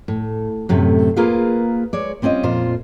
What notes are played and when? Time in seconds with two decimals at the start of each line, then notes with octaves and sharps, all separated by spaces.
0.08 A2
0.69 F#2 A2 C3 A3
1.16 A#3 F4 G#4 A#4 B4 F5
1.93 G#3 C#5 D5
2.22 G3 C4 C#4 F4 D#5
2.43 F2 A#2 F4 C5